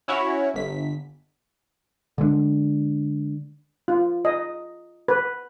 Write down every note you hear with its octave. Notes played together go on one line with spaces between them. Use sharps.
C#4 E4 F#4 C#5
G1 B6
D3 G#3 A3 D4
F4
D#5
B4